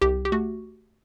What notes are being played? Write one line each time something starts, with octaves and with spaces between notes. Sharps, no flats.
C2 G4
G4
A3 F#4